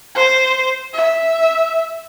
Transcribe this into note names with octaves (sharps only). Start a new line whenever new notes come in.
C5
E5